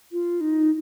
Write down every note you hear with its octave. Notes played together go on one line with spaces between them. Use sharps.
F4
D#4